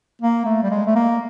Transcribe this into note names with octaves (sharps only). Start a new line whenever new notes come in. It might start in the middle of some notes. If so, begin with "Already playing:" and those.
A#3
A3
G3
G#3
A3
A#3